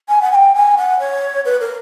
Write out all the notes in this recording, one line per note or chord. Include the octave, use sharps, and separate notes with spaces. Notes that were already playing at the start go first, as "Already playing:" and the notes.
G#5
F#5
G#5
G5
G#5
F#5
C#5
B4
A#4